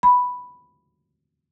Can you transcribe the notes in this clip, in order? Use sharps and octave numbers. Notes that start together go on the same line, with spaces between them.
B5